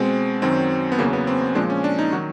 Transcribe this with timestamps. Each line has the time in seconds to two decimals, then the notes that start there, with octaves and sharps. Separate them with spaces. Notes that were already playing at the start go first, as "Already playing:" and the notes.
Already playing: B2 G#3 C4
0.42 F#2 D#3 F#3 C4
0.92 B3
0.99 E2 C#3 F#3 A#3
1.13 B3
1.27 C4
1.55 A#2 F3 G#3 D4
1.70 C#4
1.84 D4
1.98 D#4
2.13 D#3 F#3 F#4